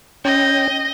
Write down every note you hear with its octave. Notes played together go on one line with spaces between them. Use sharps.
C#4 D#5 G5